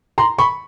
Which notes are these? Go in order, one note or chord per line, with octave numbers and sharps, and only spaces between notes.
A#5 C6
B5 C#6